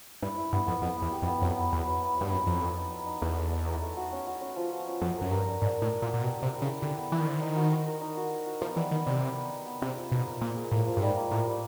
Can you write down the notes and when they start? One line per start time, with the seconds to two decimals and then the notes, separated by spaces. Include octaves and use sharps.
0.23 G2 E4
0.38 E4
0.52 G2 B3
0.67 F2 B3
0.82 F2 B3
0.97 B3
1.02 E2
1.12 G4
1.22 F2
1.27 B3
1.42 F2 F#3
1.57 B3
1.73 E2 E4
1.88 F#3
2.02 B3
2.17 G2 F#3
2.32 F#2 F#3
2.47 F2 F#3
2.62 A4
2.78 D#4
2.92 D#4
3.07 D#4
3.22 E2 D#4
3.36 A4
3.53 D#4
3.68 A4
3.82 A3
3.97 F#4
4.13 C#4
4.27 F#4
4.41 C#4
4.56 F3
4.72 F#4
4.88 C#4
5.02 F2 F#4
5.18 F#2 A#4
5.31 G2 A#4
5.47 D4
5.62 G#2 D4
5.77 A2 A#4
5.92 D4
6.02 A#2
6.07 F#4
6.14 A#2
6.21 B2 G4
6.37 C3 G4
6.52 E4
6.62 C#3
6.67 E4
6.82 D3 G4
6.97 B3
7.12 E3 E4
7.20 D#3
7.26 D3 C5
7.37 D#3
7.42 D#4
7.56 F#4
7.72 A#4
7.86 A#4
8.01 D#4
8.17 F#4
8.31 A#4
8.46 F#4
8.61 F3 B3
8.76 E3 G3
8.91 D#3 B3
9.06 C3 G3
9.22 B3
9.36 B3
9.52 B3
9.66 B3
9.82 C3 G#4
9.97 F3
10.11 B2 D#4
10.27 A#3
10.41 A#2 A#3
10.57 G#4
10.71 A2 A#3
10.87 F3
10.97 G2
11.02 G#2 G3
11.16 A#3
11.31 A2 A#3
11.47 G3